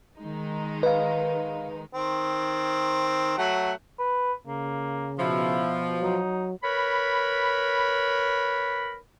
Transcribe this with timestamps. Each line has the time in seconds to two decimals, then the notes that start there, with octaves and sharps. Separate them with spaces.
0.17 D#3 G#3 D#4
0.83 B4 D#5 F5
1.93 D#3 C4
3.38 F#3 A3 F#5
3.99 B4
4.47 C#3 A#3
5.19 B2 F3 E4
6.03 F#3 D#4
6.64 A#4 B4 C#5 B5